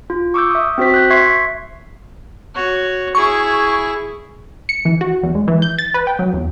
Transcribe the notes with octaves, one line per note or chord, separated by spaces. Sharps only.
F4
C#6 D6 E6 G6
E5 D#6
C4 F#4 C5 B6
F#6 G6
E5 C6 C#6 G#6 B6 C7
F#4 C#5
E4 G#4 C#6
C#7
E3
F#4
E2
G#3
E3
G6
A6
B4
G5
F#3
E2